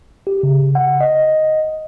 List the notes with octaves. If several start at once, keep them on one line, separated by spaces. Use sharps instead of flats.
G4
C#3
F#5
D#5